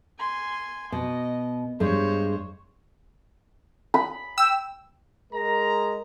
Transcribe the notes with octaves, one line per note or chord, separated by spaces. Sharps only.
G#5 C6
B2 D#5
G2 G#3 C5 C#5
B5
G5 E6
G#3 A#4 A#5